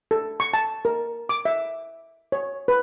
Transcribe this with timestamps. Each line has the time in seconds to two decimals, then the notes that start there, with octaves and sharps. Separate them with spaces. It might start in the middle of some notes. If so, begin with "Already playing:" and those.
0.11 A4
0.40 C#6
0.54 A5
0.85 A#4
1.29 D6
1.45 E5
2.32 C#5
2.68 B4